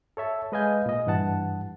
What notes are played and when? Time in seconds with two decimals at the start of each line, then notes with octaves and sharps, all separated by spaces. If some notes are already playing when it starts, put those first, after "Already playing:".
0.17 A4 C#5 E5 A5
0.52 G#3 B4 D#5 F5 G#5 G6
0.86 A#2 D#5
1.07 G2 E3 F#5 A5